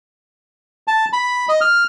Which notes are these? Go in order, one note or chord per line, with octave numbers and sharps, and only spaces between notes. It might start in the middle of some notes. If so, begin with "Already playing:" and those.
A5
B5
D#5
F6